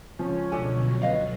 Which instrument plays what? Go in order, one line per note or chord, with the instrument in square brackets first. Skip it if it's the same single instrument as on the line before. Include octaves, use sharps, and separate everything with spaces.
[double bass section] C#2 C#4 [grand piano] F3
[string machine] B2 D3 F#3 [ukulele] D4 A4 G#5
[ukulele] B4 D#5 F5